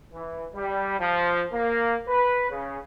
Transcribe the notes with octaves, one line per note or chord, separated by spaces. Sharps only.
E3
G3
F3
A#3
B4
C#3